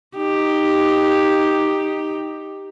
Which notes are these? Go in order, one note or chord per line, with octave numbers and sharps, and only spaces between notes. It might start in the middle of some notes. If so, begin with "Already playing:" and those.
D#4 G4